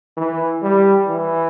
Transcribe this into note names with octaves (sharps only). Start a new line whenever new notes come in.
E3
G3
E3